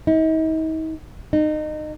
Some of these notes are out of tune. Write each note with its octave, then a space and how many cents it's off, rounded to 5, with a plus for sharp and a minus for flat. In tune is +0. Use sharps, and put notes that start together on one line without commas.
D#4 +40
D#4 -25